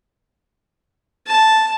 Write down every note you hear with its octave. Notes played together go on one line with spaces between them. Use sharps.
A5